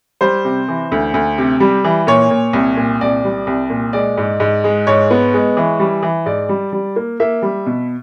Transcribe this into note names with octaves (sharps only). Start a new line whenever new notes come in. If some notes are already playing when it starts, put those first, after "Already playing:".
G3 C5
C3
E3
D2
D2
C3
G3
E3
A#2 C#5
A#2
C2
A#2
C2 D5
G3
C2
A#2
G#3 D5
G#2
G#2
G#3
G#2 C#5
B3
G#3
E3
G3
E3
G#2 D5
G3
G3
A#3
A#3 E5
G3
B2